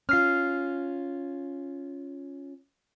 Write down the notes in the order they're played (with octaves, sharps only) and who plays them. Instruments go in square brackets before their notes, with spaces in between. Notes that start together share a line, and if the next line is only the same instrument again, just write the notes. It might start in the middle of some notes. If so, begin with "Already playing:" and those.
[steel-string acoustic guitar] C#4 F4 [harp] F6 C7